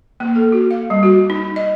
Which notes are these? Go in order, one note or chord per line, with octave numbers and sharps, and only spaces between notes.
A#3
A4
F#4
F5
G3
F#4
D#4
D#5